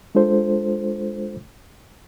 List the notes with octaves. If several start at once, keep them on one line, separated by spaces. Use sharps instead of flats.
G#3 D4 F4 A4 C5